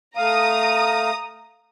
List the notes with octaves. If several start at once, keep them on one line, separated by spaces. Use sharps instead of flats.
A3 F5 A#5 D#6